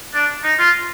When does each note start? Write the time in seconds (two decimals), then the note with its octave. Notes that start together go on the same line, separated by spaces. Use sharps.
0.15 D4
0.44 D#4
0.59 F4